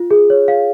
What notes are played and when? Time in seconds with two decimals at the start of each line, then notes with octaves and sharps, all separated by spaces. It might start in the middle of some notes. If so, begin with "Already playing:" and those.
Already playing: F4
0.11 G#4
0.30 C#5
0.48 F5